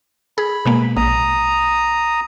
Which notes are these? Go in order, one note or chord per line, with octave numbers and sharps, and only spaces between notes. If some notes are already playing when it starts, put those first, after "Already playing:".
G#4 B5
B2 G#3 A#3
A#1 A#5 D#6